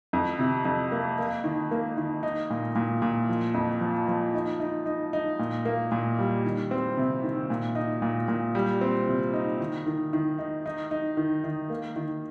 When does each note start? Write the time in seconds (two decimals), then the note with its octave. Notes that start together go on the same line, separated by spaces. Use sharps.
0.13 F2
0.39 C3
0.65 F2
0.92 A#3
1.18 A#3
1.44 D#3
1.71 A#3
1.97 D#3
2.23 D#4
2.50 A#2
2.76 A#2
3.02 A#2
3.29 F3
3.54 F2
3.81 F3
4.08 F3
4.34 D#4
4.60 D#4
4.86 D#4
5.13 D#4
5.39 A#2
5.65 A#3
5.92 A#2
6.19 G3
6.45 D#3
6.71 C4
6.97 C3
7.24 D#3
7.50 A#2
7.75 D#4
8.02 A#2
8.28 A#2
8.55 G3
8.81 C4
9.07 C3
9.34 D#4
9.59 D#3
9.86 D#3
10.13 D#3
10.39 D#4
10.66 D#4
10.91 D#4
11.17 D#3
11.44 D#3
11.70 A#3
11.96 D#3